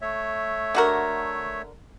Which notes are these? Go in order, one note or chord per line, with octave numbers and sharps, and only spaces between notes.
A3 C#5 E5
D3 F#4 A#4